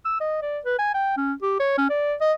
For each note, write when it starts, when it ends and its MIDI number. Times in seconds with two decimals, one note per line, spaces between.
0.05 0.20 88
0.20 0.39 75
0.42 0.59 74
0.65 0.76 71
0.79 0.92 80
0.94 1.14 79
1.17 1.33 61
1.42 1.55 67
1.60 1.73 73
1.78 1.88 61
1.90 2.14 74
2.21 2.33 75